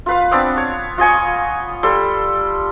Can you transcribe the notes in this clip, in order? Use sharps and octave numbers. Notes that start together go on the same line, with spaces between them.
F4 B4 F5
B3 C4 D4
C#5
F4 D#5 G#5 C#6
G3 A4 C6